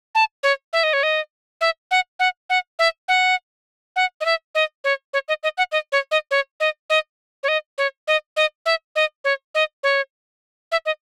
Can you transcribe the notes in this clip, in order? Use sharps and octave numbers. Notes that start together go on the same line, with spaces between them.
A5
C#5
E5
D#5
C#5
D#5
E5
F#5
F#5
F#5
E5
F#5
F#5
D#5
E5
D#5
C#5
C#5
D#5
D#5
F#5
D#5
C#5
D#5
C#5
D#5
D#5
C#5
D#5
C#5
D#5
D#5
E5
D#5
C#5
D#5
C#5
E5
D#5